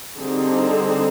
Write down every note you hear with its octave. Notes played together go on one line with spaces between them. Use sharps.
D3 G3 C4 D#4 G#4